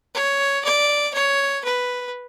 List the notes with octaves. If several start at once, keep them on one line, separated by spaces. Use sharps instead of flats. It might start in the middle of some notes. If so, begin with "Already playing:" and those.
C#5
D5
C#5
B4